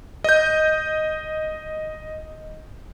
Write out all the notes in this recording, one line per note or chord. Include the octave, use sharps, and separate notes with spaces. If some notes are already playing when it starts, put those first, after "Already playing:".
D#5 G6